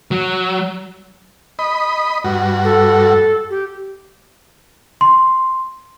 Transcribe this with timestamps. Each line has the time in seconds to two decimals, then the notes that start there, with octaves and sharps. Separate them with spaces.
0.11 F#3
1.59 D#5 B5
2.25 G2 F#4
2.64 A4
3.50 G4
5.01 C6